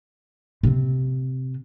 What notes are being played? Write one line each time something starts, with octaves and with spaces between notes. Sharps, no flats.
C3 C4